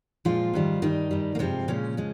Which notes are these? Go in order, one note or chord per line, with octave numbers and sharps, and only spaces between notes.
A#2 F3 G#3 F4
G#2 D#3 G3
G2 D#3 G3 D#4
G2 G3
A#3
G2 C3 F3 G#3 C4
A#2 C#3 F3 G#3 C#4
F3 G#3